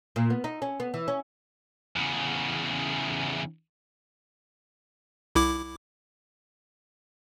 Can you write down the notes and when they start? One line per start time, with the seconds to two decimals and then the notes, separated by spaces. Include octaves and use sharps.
0.16 A#2
0.30 B3
0.44 D#4
0.62 C#4
0.80 B3
0.94 E3
1.08 C#4
1.96 E2 C#3
5.35 C2 E4 D6